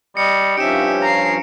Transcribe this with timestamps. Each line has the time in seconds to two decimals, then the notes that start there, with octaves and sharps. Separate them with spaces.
0.17 G3 D#5 C#7
0.57 G2 F3 C#4 D#4 G4 E5 D7 E7
1.02 A#5 C7